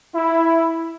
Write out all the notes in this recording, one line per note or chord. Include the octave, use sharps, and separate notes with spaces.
E4